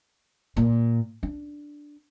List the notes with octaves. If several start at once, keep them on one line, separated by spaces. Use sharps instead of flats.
A#2
D4